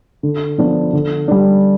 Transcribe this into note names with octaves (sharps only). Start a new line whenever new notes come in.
D3
F3 B3 D4
D3
G3 D4